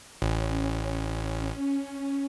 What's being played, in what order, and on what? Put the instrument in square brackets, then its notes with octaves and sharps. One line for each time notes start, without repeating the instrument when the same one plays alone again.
[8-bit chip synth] A1 [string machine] C#4